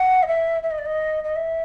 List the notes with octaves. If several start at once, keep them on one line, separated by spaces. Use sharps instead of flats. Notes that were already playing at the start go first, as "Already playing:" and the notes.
Already playing: F#5
D#5
E5
E5
D#5
D5
D#5
D#5
E5